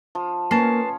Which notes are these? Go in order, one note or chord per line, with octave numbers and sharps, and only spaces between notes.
F3
A#3 C#4 B4 A5 C#6 C7